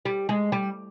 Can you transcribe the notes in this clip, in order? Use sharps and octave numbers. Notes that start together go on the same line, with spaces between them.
G3
G#3
G3